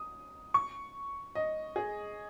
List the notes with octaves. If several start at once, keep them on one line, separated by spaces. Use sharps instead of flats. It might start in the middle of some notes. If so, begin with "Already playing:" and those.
Already playing: D#6
C#6
D#5
G#4